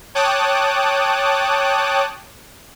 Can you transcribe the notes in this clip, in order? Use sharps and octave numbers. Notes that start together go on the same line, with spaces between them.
C#5 G5 A5 D6 D#6 F#6